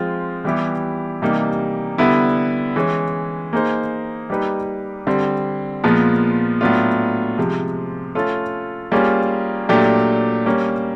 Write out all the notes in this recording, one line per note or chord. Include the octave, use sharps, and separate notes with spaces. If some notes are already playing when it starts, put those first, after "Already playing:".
Already playing: F3 G#3 C4 F4
E3 G3 B3 E4 G4
C3 E3 G3 A#3 D#4
D3 G3 B3 E4
E3 G#3 C#4
A#3 D#4 G#4 C5
G3 A#3 D#4 G4 B4
D3 G3 C4
A#2 F3 G#3 B3
A2 F#3 B3 D4 F4
C3 F3 G#3
A3 C#4 F4 A4
G3 A#3 C#4 F4 G#4
A#2 F#3 A3 D4 G4
G3 A#3 C#4